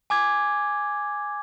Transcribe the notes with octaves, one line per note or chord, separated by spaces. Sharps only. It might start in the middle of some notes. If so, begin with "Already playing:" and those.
G#5 D6 G#6